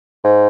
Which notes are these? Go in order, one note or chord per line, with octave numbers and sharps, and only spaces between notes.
G#2